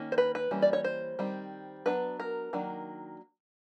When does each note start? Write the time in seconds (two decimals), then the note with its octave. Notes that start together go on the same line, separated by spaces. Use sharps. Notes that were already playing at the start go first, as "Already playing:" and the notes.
Already playing: D#3 A#3 C#4
0.12 C5
0.18 B4
0.35 B4
0.51 E3 G3 A#3 C#4
0.62 D5
0.73 C#5
0.84 C5
1.19 D#3 G3 C4
1.86 F#3 B3 D4 B4
2.20 A#4
2.53 D#3 F#3 A#3 D4